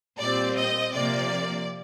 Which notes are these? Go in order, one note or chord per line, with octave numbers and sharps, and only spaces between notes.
A#2 G3 C4 D5
D#5
C3 F3 A#3 D5